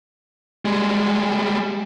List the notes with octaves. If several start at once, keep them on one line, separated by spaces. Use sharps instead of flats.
G3 G#3